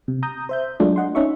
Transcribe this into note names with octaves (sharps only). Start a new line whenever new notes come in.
C3
A#5 D#6 G6
C5 E5 G6
F#3 G#3 A3 D4 F4
D#5 F#5 C6
C#4 D#4 E5 C#6